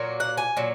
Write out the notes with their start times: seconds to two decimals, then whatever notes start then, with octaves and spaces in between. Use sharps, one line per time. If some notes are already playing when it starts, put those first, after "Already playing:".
Already playing: A#2 F#3 A#3
0.20 F#5
0.37 G#5
0.57 A#2 F#3